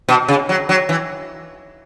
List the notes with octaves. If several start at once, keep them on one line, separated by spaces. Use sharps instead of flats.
B2
C#3
F#3
F#3
E3